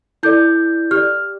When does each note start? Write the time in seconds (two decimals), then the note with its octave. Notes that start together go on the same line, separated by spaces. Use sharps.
0.23 E4 A4 D5 G6
0.91 G4 F6
0.96 D5